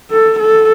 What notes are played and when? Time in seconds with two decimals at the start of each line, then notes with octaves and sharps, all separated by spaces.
0.11 A4
0.39 A4